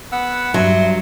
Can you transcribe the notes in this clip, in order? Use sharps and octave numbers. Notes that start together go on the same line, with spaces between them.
B3 F#5 E6
G2 F#3 E5 C6